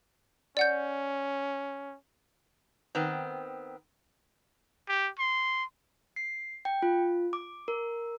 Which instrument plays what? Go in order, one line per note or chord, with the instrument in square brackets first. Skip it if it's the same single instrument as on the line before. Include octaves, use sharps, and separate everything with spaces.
[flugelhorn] C#4 [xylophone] D5 F#5 G6
[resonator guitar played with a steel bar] D#3 B3 C4
[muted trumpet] G4
C6
[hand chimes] C7
G5
F4
D6
A#4